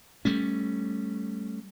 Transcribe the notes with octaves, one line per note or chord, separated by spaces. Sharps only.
G3 A3 C#4